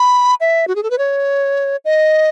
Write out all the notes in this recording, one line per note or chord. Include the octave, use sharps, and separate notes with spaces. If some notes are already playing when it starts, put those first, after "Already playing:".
Already playing: B5
E5
F#4
G#4
A4
B4
C#5
D#5